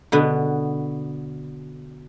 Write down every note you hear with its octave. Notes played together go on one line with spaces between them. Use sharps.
B2 D3 B3